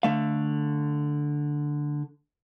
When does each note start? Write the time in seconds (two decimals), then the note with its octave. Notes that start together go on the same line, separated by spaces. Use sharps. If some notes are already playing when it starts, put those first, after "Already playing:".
0.03 D3 A3 F5